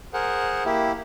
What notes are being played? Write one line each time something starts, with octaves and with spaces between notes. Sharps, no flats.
G#4 A#4 C5 F#5
A#3 E4 G4